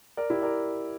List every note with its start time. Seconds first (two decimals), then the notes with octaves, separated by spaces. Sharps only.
0.17 A#4 D5
0.30 E4 G4
0.42 A#4 D5